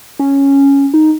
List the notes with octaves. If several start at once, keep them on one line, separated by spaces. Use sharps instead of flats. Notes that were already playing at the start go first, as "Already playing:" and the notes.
C#4
D#4